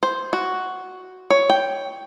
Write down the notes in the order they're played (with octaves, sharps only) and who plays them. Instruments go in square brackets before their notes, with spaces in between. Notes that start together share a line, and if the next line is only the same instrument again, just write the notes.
[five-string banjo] C5
F#4
C#5
G5